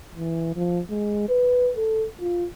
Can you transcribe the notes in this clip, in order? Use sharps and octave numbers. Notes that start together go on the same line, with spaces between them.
E3
F3
G#3
B4
A4
F4